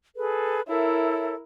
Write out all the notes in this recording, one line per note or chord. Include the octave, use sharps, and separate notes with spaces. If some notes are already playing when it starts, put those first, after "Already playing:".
G#4 A4 B4
E4 A4 A#4 C#5 E5